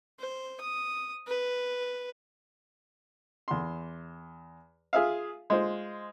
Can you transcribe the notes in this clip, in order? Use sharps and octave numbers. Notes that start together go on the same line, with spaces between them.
C5
D#6
B4
E2 C6
F4 G#4 E5 F5
G#3 F4 C5